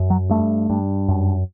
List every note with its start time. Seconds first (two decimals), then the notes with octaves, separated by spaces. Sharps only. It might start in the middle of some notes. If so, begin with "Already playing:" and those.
Already playing: F#2
0.10 F#3
0.30 G2 A3
0.70 G2
1.08 F#2